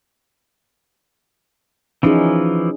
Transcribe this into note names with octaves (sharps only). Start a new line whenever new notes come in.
E3 F3 C#4 D#4 G#4